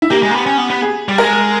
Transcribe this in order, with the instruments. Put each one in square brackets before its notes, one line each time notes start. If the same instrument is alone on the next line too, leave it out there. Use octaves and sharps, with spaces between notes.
[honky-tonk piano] E4
[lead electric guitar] A#3 [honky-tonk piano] G4
[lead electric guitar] G#3
A#3
B3
C#4
B3
B3
[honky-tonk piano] G#4
[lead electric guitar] G3
[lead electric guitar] G#3 [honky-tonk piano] A#4